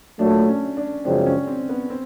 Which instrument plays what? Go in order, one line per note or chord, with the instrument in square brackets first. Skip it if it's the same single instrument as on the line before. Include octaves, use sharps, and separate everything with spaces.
[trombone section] A#2 F#3 A3 [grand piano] D4
[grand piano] C#4
D4
[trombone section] F#2 C#3 F3 G#3 C4 [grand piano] D4
[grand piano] C#4
C4
B3
C4